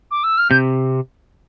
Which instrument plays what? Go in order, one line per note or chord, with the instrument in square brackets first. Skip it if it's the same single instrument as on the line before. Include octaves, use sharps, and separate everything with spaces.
[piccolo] D6
E6
F6
[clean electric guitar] C3 [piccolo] G6